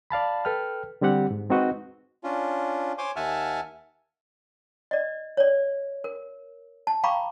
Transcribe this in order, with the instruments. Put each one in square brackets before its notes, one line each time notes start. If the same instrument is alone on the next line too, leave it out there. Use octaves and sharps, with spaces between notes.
[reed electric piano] D5 F5 A5 B5
A4 B4 G5 F6
D3 G3 C4 G4 F#5
G#2
G#3 C4 D#4 F#4 B4 D#5
[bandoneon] C#4 D4 F4
C5 C#5 G#5 C6 D6
D#2 E5 F#5 G#5 A5 F6
[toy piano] D5 D#5
C#5 D5
A#4
A5
F5 G5 A#5 B5 C#6 D6